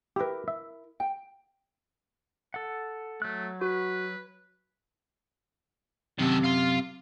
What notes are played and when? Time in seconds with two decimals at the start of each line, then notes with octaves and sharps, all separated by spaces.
0.16 E4 G4 A#4 B4
0.48 E5
1.00 G5
2.54 A4 F#5
3.22 F#3 A3 F#6
3.61 F#4 B4
6.18 F#2 C3 D#3 A4
6.44 F5 C6